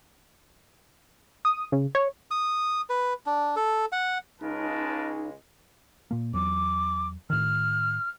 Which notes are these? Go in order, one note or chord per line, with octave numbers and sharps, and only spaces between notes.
D#6
C#3
C#5
D#6
B4
D4
A4
F#5
C#2 C#3 G#3 D#4 A#4 B4 A5
A#2 A#3
E2 F#3 D6
A2 D#3 F6